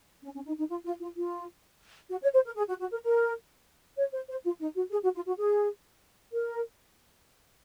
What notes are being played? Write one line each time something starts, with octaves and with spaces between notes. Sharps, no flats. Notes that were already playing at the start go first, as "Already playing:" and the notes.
C#4
C#4
D#4
D#4
F4
F4
F4
F4
F#4
C#5
C5
A#4
G#4
F#4
F#4
A#4
A#4
C#5
C5
C5
F4
D#4
F#4
G#4
F#4
F4
F#4
G#4
A#4